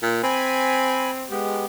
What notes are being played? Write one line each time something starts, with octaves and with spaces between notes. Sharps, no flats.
A#2
C4 G#5 B5
G#3 B3 G4